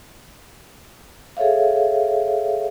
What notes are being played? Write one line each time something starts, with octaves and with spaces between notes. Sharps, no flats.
G#4 A4 C#5 E5 F5